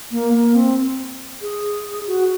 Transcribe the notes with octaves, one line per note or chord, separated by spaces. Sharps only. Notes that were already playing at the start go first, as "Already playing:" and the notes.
A#3
A#3
C4
G#4
F#4